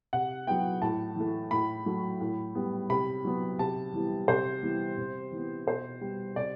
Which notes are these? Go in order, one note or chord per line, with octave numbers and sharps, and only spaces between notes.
C3 F#5
F#3 B3 G5
A2 A5
E3 A3
A2 B5
F#3 A3
A2
G3 B3
C3 B5
F#3 B3
C3 A5
E3 G3 B3
C3 C5
E3 G3 B3
C3
E3 B3
B2 C5
G3 B3
C3 D5